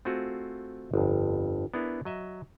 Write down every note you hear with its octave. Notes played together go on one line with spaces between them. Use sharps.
A3 C4 F4 F#4 G#4
G1 F2
B3 D4 E4 G#4 A#4
F#3 D#5 E5